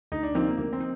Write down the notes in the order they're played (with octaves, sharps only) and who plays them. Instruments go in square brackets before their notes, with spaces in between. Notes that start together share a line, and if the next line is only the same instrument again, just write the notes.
[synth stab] D2 [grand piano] D#4
[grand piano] D4
[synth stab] C3 F3 A#3 D#4 [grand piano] C4
[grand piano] A#3
[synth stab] D2 [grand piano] A#3
[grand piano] C4
[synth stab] D#4